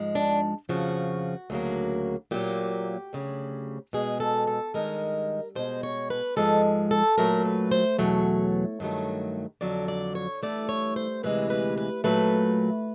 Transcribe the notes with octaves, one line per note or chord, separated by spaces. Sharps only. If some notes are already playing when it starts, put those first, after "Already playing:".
Already playing: G#2 F3 G#3
D4
F2 C#3 F3 F#4
D2 C#3 F#3 A#3
A#2 F#3 A#3 G4
D2 C#3 F#3
B2 G#3 G#4
A4
A4
G2 D#3 G#3 A#4
B2 G#3 C5
C#5
B4
G#2 F3 G#3 A4
A4
A#2 F#3 A3 A#4
B4
C5
E2 B2 F#3 A3 C#5
G2 D#3 F#3 A3
F2 D3 F#3 D5
D5
C#5
G2 E3 A3 D5
C#5
C5
D2 C3 E3 G#3 B4
B4
B4
A#2 F#3 A3 B4